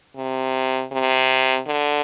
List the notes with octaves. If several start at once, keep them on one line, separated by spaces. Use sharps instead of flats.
C3
C3
D3